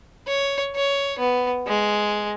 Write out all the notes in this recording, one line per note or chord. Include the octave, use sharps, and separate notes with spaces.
C#5
C#5
B3
G#3